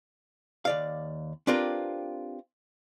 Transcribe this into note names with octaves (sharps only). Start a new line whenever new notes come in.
D#2 D5 F5
C4 D4 F4 G4 A#4 B4